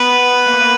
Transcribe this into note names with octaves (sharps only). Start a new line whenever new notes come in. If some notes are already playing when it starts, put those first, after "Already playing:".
Already playing: B3 B4
A#3
B3
A#3